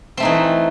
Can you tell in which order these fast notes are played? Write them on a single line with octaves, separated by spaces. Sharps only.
C4 A3 D#4 E3